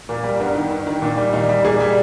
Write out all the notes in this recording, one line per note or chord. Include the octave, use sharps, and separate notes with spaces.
A#2 A#3
G3
G2 B3
D#3
G2
D#3
A#2
G3
A#2 D#4
G3
A#2 G#4
G3